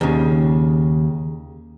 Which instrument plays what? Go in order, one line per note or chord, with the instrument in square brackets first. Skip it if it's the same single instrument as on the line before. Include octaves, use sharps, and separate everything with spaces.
[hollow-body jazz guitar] D#2 C#3